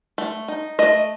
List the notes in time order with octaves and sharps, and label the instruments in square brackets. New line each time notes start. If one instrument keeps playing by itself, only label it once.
[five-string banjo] A3
D#4
A3 D#5